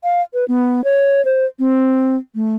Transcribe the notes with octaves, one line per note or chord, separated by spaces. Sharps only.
F5
B4
B3
C#5
C5
C4
A3